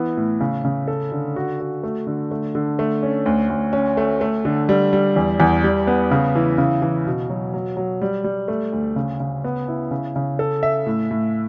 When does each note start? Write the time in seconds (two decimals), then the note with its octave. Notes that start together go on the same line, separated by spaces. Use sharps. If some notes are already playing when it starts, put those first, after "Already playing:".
Already playing: E3 B3
0.17 A2
0.41 C#3
0.65 C#3
0.88 A4
1.12 D3
1.36 F#4
1.60 F#4
1.84 A3
2.07 D3
2.31 A3
2.55 D3
2.79 A3
3.03 C#4
3.26 D2
3.50 D2
3.73 C#4
3.97 A3
4.21 A3
4.45 D3
4.69 G3
4.93 G3
5.16 E2
5.40 E2
5.64 G3
5.87 B3
6.11 C#3
6.35 E3
6.58 C#3
6.82 E3
7.07 B2
7.30 F#3
7.54 F#3
7.77 F#3
8.02 G3
8.24 G3
8.48 A3
8.73 D2
8.96 C#3
9.20 C#3
9.44 B3
9.68 E4
9.91 C#3
10.16 C#3
10.39 A4
10.63 E5
10.86 A2
11.11 A2